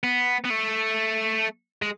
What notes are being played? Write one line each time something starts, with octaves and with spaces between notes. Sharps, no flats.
B3
B3
A3
G#3